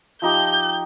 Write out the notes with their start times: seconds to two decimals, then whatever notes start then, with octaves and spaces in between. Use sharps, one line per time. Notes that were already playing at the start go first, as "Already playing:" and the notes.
0.22 F3 D#4 G4 G6